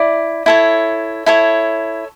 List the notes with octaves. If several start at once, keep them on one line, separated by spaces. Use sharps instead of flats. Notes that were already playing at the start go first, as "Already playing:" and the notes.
Already playing: E4 D5
E4 A4 C#5
E4 A4 C#5